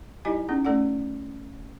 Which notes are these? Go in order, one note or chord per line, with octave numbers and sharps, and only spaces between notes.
G3 D#4 E4 G4 D#5 G#5
B3 C#4 D#4 G#4
A3 C#4 A4 D5 F#5